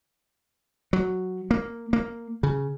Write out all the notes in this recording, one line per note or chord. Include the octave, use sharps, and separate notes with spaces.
F#3
A#3
A#3
C#3